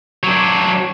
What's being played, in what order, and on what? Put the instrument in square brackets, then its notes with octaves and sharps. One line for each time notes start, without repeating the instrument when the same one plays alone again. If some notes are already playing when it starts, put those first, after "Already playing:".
[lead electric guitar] F#3 D4